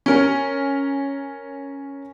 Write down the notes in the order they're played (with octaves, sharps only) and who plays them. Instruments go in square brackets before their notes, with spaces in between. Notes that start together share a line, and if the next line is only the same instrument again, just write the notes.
[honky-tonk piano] C#4 A#4